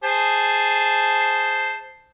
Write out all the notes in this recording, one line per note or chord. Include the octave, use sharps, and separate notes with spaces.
G#4 C5 A5